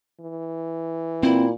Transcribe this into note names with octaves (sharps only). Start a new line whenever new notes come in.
E3
A#2 C4 E4